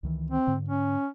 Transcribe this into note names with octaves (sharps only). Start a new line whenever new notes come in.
C#2 D#3 E3
C4
G#2 D3
C#4